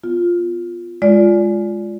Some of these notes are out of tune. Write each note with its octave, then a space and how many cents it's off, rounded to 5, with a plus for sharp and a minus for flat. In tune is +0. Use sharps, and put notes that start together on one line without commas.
B3 +0 F4 +0
G#3 +0 F4 +0 D5 -20